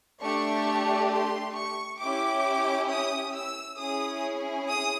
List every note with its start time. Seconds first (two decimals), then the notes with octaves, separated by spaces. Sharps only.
0.21 A3 D4 G4 C#6
1.11 C6
1.55 C#6
2.00 C#4 E4 G4 D6
2.90 D#6
3.35 E6
3.79 C#4 E4 G#4 D#6
4.69 D#6